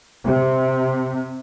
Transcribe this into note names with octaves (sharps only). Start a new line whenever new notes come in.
C3